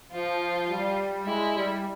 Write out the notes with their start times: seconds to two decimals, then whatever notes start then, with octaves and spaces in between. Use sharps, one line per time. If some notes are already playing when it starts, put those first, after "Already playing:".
0.12 F3 F4
0.68 G3
1.25 G#3 E4
1.54 G3